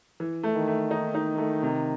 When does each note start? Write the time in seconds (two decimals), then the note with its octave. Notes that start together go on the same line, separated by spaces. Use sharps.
0.20 E3
0.43 A3
0.56 D#3
0.67 A3
0.91 D#4
1.14 D#4
1.38 A3
1.63 C3